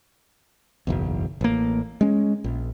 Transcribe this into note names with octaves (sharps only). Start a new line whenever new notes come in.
F#1 B1 E2
A1 A#3
G#3 C#4
A#1